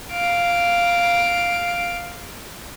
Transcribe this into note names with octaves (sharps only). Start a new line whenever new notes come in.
F5 D7